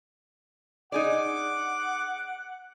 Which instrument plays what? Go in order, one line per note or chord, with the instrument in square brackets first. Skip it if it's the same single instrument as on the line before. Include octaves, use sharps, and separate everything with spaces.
[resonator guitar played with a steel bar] D#4 G#4 D5 [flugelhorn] F#5 [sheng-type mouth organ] D6